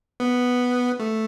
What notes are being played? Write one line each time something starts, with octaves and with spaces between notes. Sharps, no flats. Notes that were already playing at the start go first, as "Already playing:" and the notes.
B3
A3